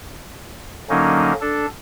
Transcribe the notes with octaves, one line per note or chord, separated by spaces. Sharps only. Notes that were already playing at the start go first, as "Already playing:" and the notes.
D3 F#3 A#3 C#4 D#4
D4 A4